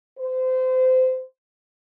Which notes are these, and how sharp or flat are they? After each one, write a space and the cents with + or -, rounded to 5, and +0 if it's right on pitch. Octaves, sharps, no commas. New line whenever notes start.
C5 -25